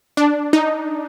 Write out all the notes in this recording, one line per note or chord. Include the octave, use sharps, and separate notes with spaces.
D4
D#4